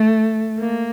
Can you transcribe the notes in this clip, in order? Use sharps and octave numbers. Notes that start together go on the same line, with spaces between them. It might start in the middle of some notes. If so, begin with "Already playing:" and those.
Already playing: A3
A#3